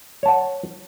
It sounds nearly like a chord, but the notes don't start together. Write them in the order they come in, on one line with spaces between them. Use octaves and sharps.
C#5 A5 F#5